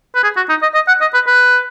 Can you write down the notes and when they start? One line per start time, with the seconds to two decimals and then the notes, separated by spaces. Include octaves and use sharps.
0.15 B4
0.23 G#4
0.37 F#4
0.49 D#4
0.62 D#5
0.75 D#5
0.88 F#5
1.01 D#5
1.14 B4
1.27 B4